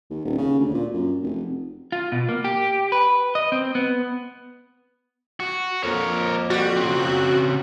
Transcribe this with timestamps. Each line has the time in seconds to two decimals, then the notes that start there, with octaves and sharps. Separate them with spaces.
0.10 D#2
0.25 D#1
0.38 C#3
0.59 D2
0.74 A#2
0.94 F#2
1.22 F1
1.92 F4
2.12 B2
2.29 A#3
2.44 G4
2.92 B4
3.35 D#5
3.52 C4
3.75 B3
5.40 F#4
5.83 F2 A#3 A#4 C#5
6.50 G3 F#4
6.76 C#3 C4